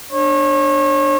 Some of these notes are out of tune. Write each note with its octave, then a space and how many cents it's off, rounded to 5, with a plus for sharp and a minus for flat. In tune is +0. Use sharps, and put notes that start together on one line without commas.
D4 +15 C#5 -35